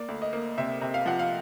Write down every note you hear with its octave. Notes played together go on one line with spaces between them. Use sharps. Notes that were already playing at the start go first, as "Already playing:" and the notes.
Already playing: A#3 D5
D2
D#5
A#3
C3 E5
C3
F5
F3 F#5
F5